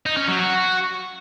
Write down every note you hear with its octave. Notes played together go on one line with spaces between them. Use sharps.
D#4
C#4
F#3
F#4